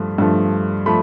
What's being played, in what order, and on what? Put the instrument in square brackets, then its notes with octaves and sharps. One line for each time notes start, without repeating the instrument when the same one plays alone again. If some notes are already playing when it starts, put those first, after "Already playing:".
Already playing: [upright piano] G2 F3 A3
G2 F3 A3
F3 A3 B5